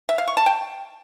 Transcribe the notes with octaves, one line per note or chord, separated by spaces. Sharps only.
E5
F5
C#6
A5
G5